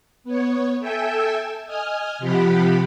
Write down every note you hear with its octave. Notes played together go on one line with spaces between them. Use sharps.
B3 C#5
A4 E5 G5 G#5 E6
D#5 G#5 F6
C3 F3 G4 F#5 B5